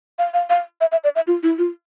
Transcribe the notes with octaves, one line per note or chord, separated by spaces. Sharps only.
F5
F5
F5
E5
E5
D5
E5
F4
E4
F4